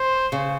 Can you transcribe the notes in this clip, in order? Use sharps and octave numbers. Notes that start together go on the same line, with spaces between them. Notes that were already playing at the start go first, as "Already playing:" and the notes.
Already playing: C5
C#3